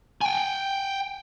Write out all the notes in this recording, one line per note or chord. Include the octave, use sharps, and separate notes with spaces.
G5 G#5